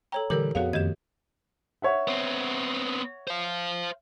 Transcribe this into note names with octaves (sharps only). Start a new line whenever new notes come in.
A4 C#5 G5 A#5
A#2 D3 E3 G3 G4 A4 A#4 F#7
F2 B3 F#4 G#4 C#5 F5 F#5
F#2 D#3 A3 G4 D#5 G#6 E7
C#5 E5 F#5
B3 C4
C5 F5